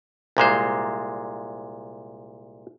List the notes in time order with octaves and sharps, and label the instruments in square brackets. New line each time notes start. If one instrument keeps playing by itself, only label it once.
[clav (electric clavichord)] C2 A#2 G#3 C5